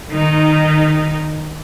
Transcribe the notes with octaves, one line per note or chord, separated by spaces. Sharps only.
D#3 D#4